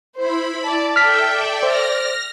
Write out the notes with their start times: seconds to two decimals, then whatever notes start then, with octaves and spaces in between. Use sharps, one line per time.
0.16 E4 C5 B5
0.65 D5 A5
0.96 A4 E5 G5 F6 B6
1.27 D5
1.63 C5 F6 A#6